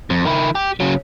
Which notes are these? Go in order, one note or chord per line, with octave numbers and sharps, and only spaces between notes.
F2
D#3 E4
G4
C#3 F#3